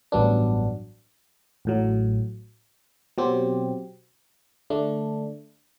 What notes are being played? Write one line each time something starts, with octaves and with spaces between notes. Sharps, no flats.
A1 G2 F#3 B3 D4
A1 A2 F#3
B2 F#3 C4 G4
D3 A3 D4